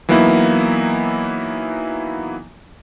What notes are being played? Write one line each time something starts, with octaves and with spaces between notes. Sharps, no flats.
E3 F#3 A#3 B3 D#4 E4